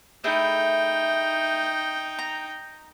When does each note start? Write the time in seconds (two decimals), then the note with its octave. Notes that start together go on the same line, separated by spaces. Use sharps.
0.24 A3 D#4 E4 G#4 G5
2.19 A#5